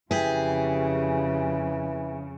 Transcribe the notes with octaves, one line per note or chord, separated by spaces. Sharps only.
F2 C#3 E3 G4 G#4